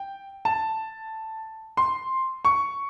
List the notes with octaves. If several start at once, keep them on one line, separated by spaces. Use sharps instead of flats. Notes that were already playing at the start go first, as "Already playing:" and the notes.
Already playing: G5
A5
C6
C#6